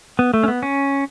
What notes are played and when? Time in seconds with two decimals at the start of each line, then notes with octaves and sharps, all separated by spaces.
0.19 B3
0.34 A3
0.43 C#4
0.48 B3
0.63 C#4